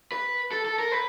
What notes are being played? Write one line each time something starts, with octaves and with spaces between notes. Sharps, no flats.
B4
A4
A4
A#4
B4